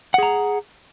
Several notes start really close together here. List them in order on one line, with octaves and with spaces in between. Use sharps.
F#5 G#4 A#5